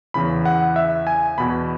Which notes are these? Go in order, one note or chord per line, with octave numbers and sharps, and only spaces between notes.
E2 C#3 E3 B5
F#5
E5
G#5
E2 B2 B5